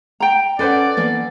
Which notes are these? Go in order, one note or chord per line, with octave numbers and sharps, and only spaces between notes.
G5 A#5
C#4 A4 B4 C5 D5 F#5
E3 A#3 B3